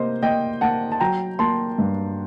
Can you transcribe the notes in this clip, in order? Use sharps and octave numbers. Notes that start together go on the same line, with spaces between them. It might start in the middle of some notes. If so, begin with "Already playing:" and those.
Already playing: C3 A#3 C5 D#5
A#3 D#5 G5
A#3 F#5 A5
A5
F#3 G5 A#5
A#3 A5 C6
G2